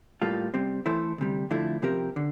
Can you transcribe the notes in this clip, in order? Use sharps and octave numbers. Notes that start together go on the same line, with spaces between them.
A2 G3 A#3 F4 A4
C3 G3 C4
E3 A3 E4 A4 C5
D2 C3 G3
F2 D3 F3 A3 E4
C3 F3 C4 G4 A#4
D3